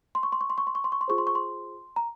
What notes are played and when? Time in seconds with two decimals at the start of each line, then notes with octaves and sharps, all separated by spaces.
0.15 C6
0.23 C#6
0.32 C6
0.41 C#6
0.50 C6
0.58 C#6
0.67 C6
0.75 C#6
0.84 C6
0.92 C#6
1.01 C6
1.08 F4 G#4 C5 C#6
1.18 C6
1.27 C#6
1.35 C6
1.96 A#5